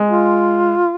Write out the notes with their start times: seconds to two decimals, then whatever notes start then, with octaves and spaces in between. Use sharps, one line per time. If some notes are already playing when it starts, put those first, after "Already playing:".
Already playing: G#3
0.08 F4